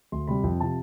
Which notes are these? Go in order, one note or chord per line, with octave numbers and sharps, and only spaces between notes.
D2 C6
C3 G3 B5
F2
C3 F3 A5